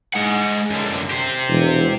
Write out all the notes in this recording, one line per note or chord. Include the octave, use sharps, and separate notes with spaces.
G#3 F#5
F#2 D3
G4 C5
E1